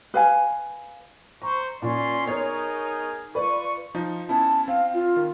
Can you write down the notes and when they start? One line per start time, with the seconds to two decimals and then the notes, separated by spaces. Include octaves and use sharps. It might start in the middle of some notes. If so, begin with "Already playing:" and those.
0.14 B4 F5 G#5
1.42 C5 A#5 C#6
1.82 A#2 C#4 D5 C6
2.26 B3 D#4 G#4 A#4 C#5
3.35 F4 B4 D5 C#6
3.95 F3 D#4
4.29 B3 C#4 E4 A5
4.68 C4 F5
4.94 F4
5.16 D#3